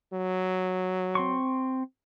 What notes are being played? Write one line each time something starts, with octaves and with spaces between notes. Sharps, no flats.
F#3
C4 C6 C#6